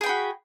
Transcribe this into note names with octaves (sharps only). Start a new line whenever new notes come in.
F#4 G#4 G5 B5